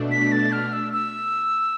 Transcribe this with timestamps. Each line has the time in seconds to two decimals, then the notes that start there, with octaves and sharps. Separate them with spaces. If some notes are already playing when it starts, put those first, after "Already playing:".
Already playing: B2 A3 D4
0.11 B6
0.32 A6
0.52 F6
0.73 E6
0.93 E6